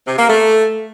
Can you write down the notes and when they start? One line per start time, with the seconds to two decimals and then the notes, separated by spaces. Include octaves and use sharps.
0.07 C3
0.18 A#3
0.29 A3